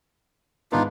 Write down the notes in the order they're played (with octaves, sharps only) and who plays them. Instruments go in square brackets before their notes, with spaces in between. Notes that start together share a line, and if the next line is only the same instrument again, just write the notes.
[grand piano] G#2 B3 [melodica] D4 D#4 F4